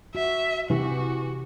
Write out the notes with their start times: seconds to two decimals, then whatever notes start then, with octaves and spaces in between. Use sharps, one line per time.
0.15 F#4 E5
0.70 C3 E3 F#4 G4